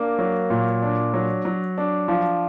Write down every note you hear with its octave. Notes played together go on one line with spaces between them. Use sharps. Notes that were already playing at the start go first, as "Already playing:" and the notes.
Already playing: A#3 D4
F#3
A#2
D4
F#3
F#3
D4
F3